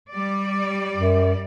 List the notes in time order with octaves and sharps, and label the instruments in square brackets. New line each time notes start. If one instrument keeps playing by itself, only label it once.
[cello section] G3 D5
[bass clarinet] F#2